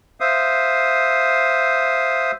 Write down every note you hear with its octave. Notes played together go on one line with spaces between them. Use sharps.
C5 E5 F5 D#6